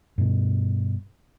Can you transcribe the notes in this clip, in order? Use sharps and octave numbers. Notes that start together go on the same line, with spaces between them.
G2 B2